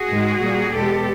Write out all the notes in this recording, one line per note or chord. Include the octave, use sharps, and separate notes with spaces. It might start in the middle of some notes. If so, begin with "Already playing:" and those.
Already playing: F#4 G#4
G#2 D#3 G#3
A#2 G3 A#3
E2 B2 G#3 G4 A4